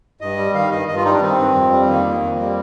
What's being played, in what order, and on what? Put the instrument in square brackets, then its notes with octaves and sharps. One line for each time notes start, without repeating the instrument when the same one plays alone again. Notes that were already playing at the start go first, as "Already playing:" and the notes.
[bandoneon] G2 D#5
G3
D#3 F5
G2 D#5
G2 D#5
F4
G3 D#4
D4
D#3 C4
G2
F2
G3
D#3 A#3
F2
F2
G3